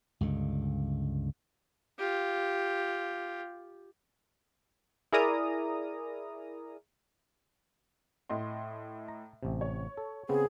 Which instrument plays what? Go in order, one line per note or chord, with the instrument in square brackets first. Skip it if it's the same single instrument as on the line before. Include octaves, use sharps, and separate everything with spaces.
[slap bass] C#2 G2 D3
[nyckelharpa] F4 G4
[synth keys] E4 G#4 A#4 D5 A#5 D#6
[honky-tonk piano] A2 D#5 C6
[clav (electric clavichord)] A#5
A1 C3
[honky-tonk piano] C#5
[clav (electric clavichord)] A4
[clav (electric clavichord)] C#3 B3 C4 [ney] G#4